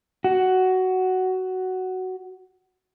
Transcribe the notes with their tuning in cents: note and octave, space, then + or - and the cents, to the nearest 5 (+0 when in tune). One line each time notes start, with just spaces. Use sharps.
F#4 +10